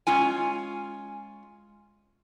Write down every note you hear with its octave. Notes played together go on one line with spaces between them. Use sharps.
G#3 C#4 F4 G#5